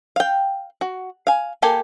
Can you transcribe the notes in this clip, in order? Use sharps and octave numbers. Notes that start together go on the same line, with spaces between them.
F5 G5
F#4
F5 G#5
A#3 G4 A4 G#5